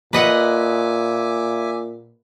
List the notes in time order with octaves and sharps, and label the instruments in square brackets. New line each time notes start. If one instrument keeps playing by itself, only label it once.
[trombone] A#2 [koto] B4 D#5 F#5 [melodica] E5 G#5 D6